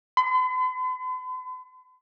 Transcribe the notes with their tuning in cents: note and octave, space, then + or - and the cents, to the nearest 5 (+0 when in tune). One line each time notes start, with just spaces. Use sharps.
B5 +45